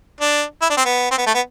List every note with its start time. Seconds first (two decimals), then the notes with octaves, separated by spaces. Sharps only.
0.21 D4
0.62 E4
0.70 D4
0.77 C4
0.85 B3
1.11 C4
1.18 B3
1.26 A3
1.35 B3